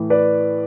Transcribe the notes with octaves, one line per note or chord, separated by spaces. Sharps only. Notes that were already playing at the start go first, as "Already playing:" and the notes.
Already playing: A2 E3
B4 D5